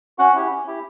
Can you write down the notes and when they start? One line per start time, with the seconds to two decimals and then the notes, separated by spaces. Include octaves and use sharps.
0.18 C#4 F#4 F#5
0.35 E4 G4
0.51 C#4
0.66 E4 G4